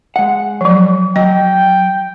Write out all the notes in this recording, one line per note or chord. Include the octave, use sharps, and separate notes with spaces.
G#3 F#5
F3 F#3
F#3 D#5 G5